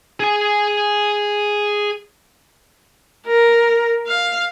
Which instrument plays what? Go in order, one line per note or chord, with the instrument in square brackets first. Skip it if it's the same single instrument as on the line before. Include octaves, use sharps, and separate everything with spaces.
[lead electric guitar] G#4 G#5
[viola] A#4
F5